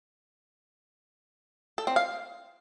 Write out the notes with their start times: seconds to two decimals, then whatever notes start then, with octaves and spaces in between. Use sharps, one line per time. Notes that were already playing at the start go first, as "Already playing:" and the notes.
1.78 A4
1.87 C4
1.96 F5